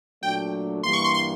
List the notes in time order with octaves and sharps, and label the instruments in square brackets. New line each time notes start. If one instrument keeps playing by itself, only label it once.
[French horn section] A#2 F#3 A3 D4 F#4 [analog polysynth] G5
[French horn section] G2 E3 G3 A#3 [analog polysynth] C6
[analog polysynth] C#6
C6
C6